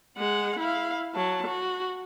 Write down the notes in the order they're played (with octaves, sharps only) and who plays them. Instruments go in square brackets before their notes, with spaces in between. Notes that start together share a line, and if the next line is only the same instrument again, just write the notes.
[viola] G#3 F#5
E4 F5
F#3 A5
F#4